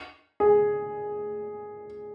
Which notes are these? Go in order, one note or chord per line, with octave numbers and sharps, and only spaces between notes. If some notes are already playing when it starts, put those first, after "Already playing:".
G#4